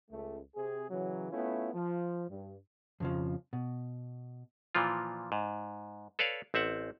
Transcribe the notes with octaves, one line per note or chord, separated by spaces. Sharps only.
C#2 A3
C3 C4 G#4
C#3 E3 F#3
A3 B3 C#4 E4 F4
F3
G2
F2 C#3 F3
B2
A#2 E3 F3 F4
G#2
A4 B4 C#5 D5 F5
A1 C4 E5 F#5